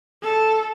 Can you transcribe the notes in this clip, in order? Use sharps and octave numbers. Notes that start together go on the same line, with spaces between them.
A4